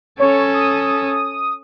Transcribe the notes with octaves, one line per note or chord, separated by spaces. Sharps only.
C#4 A4 C#5
D#6